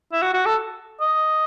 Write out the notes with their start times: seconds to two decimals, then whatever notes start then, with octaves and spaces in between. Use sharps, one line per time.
0.12 E4
0.22 F#4
0.34 F#4
0.46 A4
1.01 D#5